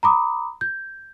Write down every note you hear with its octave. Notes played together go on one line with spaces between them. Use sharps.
A#5 B5 D6 D#6
G6